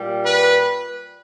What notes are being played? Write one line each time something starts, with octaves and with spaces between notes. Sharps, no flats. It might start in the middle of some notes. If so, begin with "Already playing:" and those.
Already playing: A#2 G3
B4